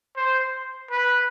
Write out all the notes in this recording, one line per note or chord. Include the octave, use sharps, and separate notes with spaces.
C5
B4